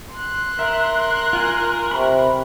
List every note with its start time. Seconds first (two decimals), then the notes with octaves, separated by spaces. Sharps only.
0.12 C6 F#6
0.59 A#4 E5
1.33 F4 G#5
1.91 C3 B5 C#6